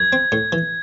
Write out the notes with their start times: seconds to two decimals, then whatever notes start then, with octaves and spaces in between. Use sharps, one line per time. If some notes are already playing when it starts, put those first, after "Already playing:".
Already playing: F#2 G#6
0.13 C4
0.32 A2
0.52 E3